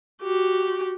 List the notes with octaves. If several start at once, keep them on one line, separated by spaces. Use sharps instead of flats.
F#4 G4